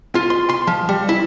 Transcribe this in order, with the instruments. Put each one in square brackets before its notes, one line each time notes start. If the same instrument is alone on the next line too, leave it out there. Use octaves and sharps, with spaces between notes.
[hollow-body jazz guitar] F4
C6
C6
F3
G3
E4